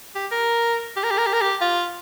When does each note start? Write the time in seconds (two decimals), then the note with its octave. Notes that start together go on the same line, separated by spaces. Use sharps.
0.15 G4
0.31 A#4
0.96 G4
1.04 A#4
1.10 G4
1.18 A#4
1.26 G4
1.33 A#4
1.41 G4
1.61 F4